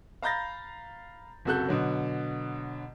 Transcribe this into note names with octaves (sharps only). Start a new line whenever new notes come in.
F5 A#5 B5 G6 A6 A#6
F#1 C3 F#4 A4 F#6 G6
B2 D3 F#3